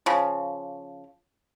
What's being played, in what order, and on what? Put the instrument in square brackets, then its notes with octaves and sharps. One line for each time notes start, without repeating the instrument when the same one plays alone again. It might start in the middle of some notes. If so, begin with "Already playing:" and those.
[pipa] C#3 F3